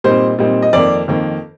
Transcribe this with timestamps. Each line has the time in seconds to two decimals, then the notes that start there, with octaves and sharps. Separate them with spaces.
0.04 A#2 G3 C4 D#4 C5
0.38 A#2 G3 C4 D#4
0.62 D#5
0.73 F2 D#3 A#3 D5
1.08 F2 D#3 A#3